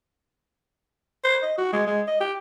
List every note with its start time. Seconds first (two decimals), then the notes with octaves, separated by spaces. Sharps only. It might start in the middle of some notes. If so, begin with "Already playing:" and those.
1.24 C5
1.43 D#5
1.58 F#4
1.73 G#3
1.87 G#3
2.07 D#5
2.20 G4